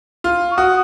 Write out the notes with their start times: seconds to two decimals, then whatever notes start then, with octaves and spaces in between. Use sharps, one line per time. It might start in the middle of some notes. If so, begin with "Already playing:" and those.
0.24 F4
0.51 C#6
0.57 F#4 D#6